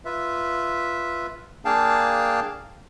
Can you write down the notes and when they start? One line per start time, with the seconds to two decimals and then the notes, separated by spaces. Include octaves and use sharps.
0.05 F4 B4 E5
1.65 A#3 D4 G#4 F5 G5 A5